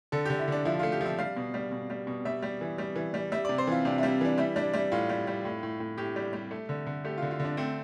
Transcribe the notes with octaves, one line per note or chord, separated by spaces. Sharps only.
D3 A4
G4
D3
E4
D3 D4
F3 E4
A3 F4
G4
F3 E5
G3 F5
B2
G3
B2
G3
B2
G3 E5
G3
E3
G3
E3
G3
G3 E5
C3 D5
C5
E3 F4
C3 D4
E4
G3
E3 D4
G3 E4
G3 D4
G3 E4
A2 F4
G3
G3
A2
A2
A2
A2 G4
G3
G3
A3
D3
D3
A3 G4
F4
D3
F4
D3
D4
A3 C4